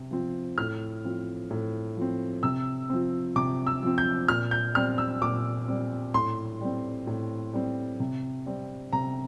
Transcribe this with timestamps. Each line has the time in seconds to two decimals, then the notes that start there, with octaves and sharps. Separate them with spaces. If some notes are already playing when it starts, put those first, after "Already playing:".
Already playing: C3
0.11 F3 C4
0.58 A2 F6
1.04 F3 C4
1.51 A2
1.96 F3 C4
2.43 C3 E6
2.90 F3 C4
3.36 C3 D6
3.67 E6
3.83 F3 C4
3.98 G6
4.28 A#2 F6
4.51 G6
4.75 G3 C4 F6
4.98 E6
5.22 A#2 D6
5.68 G3 C4
6.14 A2 C6
6.61 G3 C4
7.07 A2
7.53 G3 C4
8.00 C3
8.46 G3 C4
8.93 C3 A#5